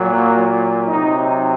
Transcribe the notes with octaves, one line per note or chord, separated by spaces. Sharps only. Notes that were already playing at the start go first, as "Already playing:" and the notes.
Already playing: A#2 F#3
A#3
C3 F#3 D#4